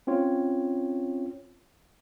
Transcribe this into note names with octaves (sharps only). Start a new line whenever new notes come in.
C4 C#4 F4 C#5